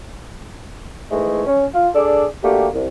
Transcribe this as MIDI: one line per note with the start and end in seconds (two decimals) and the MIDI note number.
1.11 1.43 44
1.11 1.43 52
1.11 1.43 56
1.11 1.43 57
1.46 1.66 61
1.74 1.88 65
1.95 2.25 62
1.95 2.25 68
1.95 2.25 69
1.95 2.25 74
2.44 2.68 57
2.44 2.68 58
2.44 2.68 62
2.44 2.68 66
2.44 2.68 67
2.74 2.87 36